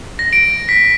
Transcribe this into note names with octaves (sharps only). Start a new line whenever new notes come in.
A#6
D7
B6